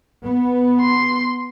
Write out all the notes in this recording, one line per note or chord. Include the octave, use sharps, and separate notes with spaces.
B3
C6